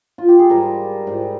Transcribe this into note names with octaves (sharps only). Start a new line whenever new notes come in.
F4
G4
G#4
G#2 G3 A#4
G#2 G3